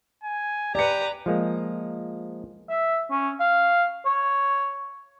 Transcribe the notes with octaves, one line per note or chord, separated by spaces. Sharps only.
G#5
G4 B4 D5 A#5 C#7
F3 G#3 A#3
E5
C#4
F5
C#5